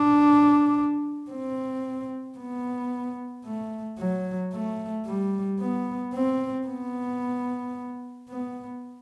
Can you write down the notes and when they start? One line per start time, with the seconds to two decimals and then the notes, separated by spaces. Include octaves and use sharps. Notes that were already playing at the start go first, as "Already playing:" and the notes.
Already playing: D4
1.30 C4
2.38 B3
3.45 A3
3.99 F#3
4.53 A3
5.07 G3
5.60 B3
6.14 C4
6.67 B3
8.29 B3